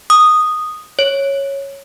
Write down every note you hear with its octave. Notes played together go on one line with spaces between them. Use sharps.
D#6
C#5